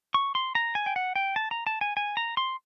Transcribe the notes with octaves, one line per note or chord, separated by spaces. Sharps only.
C#6
C6
A#5
G#5
G5
F#5
G5
A5
A#5
A5
G#5
G#5
A#5
C6